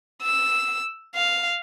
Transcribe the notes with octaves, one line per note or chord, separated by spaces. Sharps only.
E6
F5